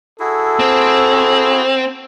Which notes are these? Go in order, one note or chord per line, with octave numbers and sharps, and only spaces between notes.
E4 F#4 G#4 A4
C4